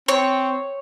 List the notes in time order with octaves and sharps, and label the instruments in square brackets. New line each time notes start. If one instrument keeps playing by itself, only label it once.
[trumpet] C4 [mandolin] C#5